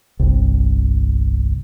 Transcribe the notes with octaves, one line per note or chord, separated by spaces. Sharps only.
G1 C2